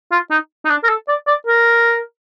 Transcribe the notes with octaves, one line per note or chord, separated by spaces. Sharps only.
F4
D#4
D#4
D4
A#4
A4
D5
D5
A#4